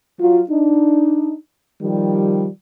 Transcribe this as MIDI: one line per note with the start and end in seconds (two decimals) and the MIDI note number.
0.19 0.40 54
0.19 0.40 65
0.50 1.34 62
0.50 1.34 63
1.80 2.48 51
1.80 2.48 53
1.80 2.48 55